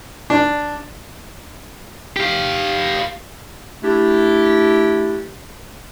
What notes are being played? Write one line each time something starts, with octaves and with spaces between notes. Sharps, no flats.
D4
G4 F5
A3 D4 E4 G4